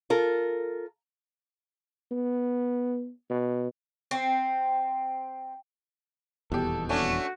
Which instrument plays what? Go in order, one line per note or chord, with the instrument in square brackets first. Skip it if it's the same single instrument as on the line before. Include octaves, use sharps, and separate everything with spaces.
[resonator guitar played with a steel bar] F4 A4 A#4
[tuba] B3
B2
[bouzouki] C4
[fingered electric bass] D#1 E2 [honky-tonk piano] B2 G4 [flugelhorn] A4
[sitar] A3 C#4 D4 [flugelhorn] F#4